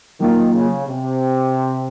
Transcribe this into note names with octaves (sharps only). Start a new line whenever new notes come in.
D#3 F#3 A#3 F4
C#3
C3